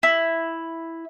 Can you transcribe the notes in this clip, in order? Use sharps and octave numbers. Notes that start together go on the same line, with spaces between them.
E4